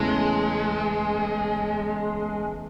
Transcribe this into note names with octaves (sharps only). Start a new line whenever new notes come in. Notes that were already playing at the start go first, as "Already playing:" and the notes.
Already playing: E2 C#3 E3 G#3 A3 C#4